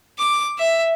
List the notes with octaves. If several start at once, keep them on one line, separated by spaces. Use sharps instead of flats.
D6
E5